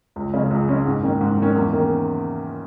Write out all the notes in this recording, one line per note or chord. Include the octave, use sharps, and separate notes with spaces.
C#2
C#3 G#3 C#4
C#2
C#3 G#3 C#4
G#2
D#3 A#3 C#4
G#2
D#3 A#3 C#4
E2
D#3 A#3 C#4